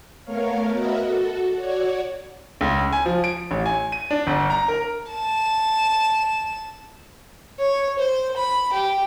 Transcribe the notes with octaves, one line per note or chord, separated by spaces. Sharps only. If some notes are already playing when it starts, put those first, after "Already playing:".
A3 B3 A#4 C#5 F5
F#4 A#4 B4 D#5 E5
F#4 A4
F#4 C#5 D5 G#6
C#2
G#5
F3
D7
A1
G#5
D#7
D4
G1
A#5
A#4
A5 E7
C#5
C5
B5
G4